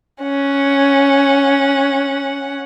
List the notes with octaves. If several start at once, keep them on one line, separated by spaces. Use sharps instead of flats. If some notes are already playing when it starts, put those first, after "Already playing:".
C#4 F#5